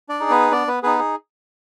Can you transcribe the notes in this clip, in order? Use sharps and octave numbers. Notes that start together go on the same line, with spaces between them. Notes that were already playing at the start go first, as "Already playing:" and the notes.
D4 D5
D#4 G#4
B3 B4
B3 D4 D5
B3 B4
B3 D#4 G#4 B4
G#4